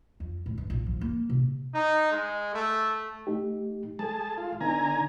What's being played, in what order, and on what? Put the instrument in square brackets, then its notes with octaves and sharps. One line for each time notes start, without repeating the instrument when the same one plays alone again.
[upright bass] F2
A2
G2
A#1
F3
A#3
C3
[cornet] D#4
G#3
A3
[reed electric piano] A3 D#4 G4
[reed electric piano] G#3 A4 [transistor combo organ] G#4 A5
[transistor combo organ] F4
[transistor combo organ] D3 G#5 A#5 [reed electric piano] B3 D#4